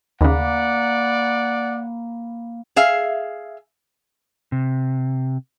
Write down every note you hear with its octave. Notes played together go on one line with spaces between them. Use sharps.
D#2 C#3 A#3 D5 F#5 A#5 B5
G#4 E5 F5
C3